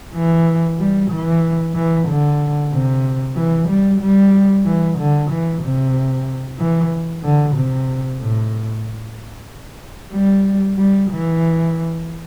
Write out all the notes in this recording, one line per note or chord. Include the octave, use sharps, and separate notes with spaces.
E3
G3
E3
E3
D3
C3
E3
G3
G3
E3
D3
E3
C3
E3
D3
C3
A2
G3
G3
E3